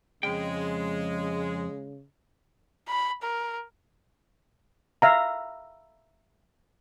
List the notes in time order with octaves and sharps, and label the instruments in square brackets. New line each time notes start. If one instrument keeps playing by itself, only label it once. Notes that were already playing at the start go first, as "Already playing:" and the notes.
[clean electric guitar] F2 G5 [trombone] C#3 [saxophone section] G#3
[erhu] B5
A#4
[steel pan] E5 F5 A#5